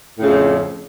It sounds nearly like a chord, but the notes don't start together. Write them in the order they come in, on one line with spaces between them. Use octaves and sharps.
A2 C#3 F2